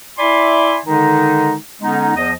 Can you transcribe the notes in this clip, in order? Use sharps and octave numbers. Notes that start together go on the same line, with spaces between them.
E4 D5 E5 G#5 B5 C6
D3 D#3 G#3 D#4
D3 G#3 B3 C#4 D#4
E2 F3 D#5